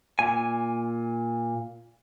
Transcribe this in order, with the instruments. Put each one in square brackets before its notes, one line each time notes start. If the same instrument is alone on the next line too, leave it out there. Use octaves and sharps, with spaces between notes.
[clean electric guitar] A#2 G#5